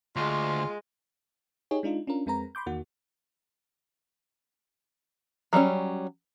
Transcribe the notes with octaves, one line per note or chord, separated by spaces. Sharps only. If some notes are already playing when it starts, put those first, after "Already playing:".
D2 G#3 F4
D#4 G4 G#4 C#5
G#3 D4 D#4 F4
C#4 D4 F4 A#4
F2 G#3 C4 A#4 B4 A#5
B5 C6 D6 G6
E2 D#3 A#3 F#4
F#3 G3 B3 C#4